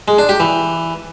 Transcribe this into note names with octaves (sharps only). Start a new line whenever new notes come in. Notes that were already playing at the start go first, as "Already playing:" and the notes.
G#3
D4
G4
E3